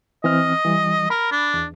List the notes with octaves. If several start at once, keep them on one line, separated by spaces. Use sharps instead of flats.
E3 C4 D#5 F6
E3 G3
A#4 B5
D4
E2